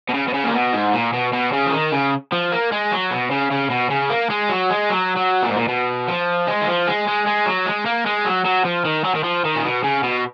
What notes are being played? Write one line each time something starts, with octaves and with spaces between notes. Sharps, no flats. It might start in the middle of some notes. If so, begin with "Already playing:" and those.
B2
C#3
B2
C#3
A#2
B2
G#2
A#2
B2
B2
C#3
F3
D#3
C#3
F3
A#3
G#3
F#3
B2
C#3
C#3
B2
C#3
A#3
G#3
F#3
G#3
F#3
F#3
A#2
G#2
A#2
B2
F3
G#3
D#3
F3
G#3
G#3
G#3
F#3
G#3
A#3
G#3
F#3
F#3
F3
D#3
F#3
D#3
F3
D#3
A#2
B2
C#3
B2